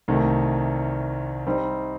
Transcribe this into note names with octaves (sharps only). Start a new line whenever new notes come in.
C2 C3 D#3 A3
G3 C4 D#4